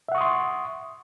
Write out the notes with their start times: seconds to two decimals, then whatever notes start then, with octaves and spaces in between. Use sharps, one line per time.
0.08 E5
0.12 F#5
0.15 C#6
0.18 D#6
0.21 C6